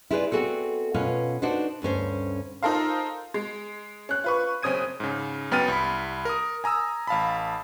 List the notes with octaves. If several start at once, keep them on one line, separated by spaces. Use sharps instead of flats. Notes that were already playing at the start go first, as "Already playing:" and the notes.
E4 F4 G#4 B4 C5 D5
B3 C4 F#4 G#4 A4
B2 C#4 F4 B4 F5
D4 D#4 F#4 B4 C5
D2 G2 C#4 C5
D#4 F4 A4 A#4 C5 F5
G#3
C#4 F#6
F4 B4 C#6
F#1 C4 C#4 D#6 G#6 D#7
G#2 C#3
F#2 B3 G5 F6 A6 D#7
C2 B5
A#4 D#6
G#5 A#5 D#6 E6
A1 F5 A5 B5